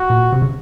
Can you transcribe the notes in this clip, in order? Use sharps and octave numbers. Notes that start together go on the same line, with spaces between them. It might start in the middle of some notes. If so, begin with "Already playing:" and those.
Already playing: F#4
A#2
C3
C#3